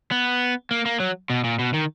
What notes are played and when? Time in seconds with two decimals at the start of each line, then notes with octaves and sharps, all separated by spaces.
0.11 B3
0.71 A#3
0.86 A#3
1.00 F#3
1.30 B2
1.44 A#2
1.59 B2
1.74 D#3